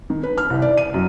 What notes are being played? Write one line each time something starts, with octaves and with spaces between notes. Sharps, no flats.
D#3
B4
F6
C2
D5
D#7
F#2